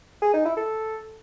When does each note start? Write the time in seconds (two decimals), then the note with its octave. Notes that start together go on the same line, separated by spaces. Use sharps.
0.22 G#4
0.33 D#4
0.45 E4
0.56 A4